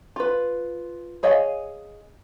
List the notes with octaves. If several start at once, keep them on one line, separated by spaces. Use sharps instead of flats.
F4 B4
G#4 C#5 D#5 F5 G#5